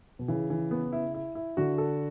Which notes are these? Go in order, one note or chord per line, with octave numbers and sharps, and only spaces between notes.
B2
C#3 E3
E3
B3
E4
E4
E4
D3 F#4
A4